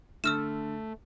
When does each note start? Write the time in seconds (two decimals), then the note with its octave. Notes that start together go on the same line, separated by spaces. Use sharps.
0.24 D3 A3 E6 F6 E7